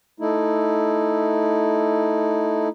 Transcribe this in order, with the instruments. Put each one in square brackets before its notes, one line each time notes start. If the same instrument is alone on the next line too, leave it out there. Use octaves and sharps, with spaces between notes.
[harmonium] A3 D#4 E4